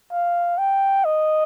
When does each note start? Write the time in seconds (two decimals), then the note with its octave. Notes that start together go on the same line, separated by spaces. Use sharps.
0.12 F5
0.58 G5
1.05 D#5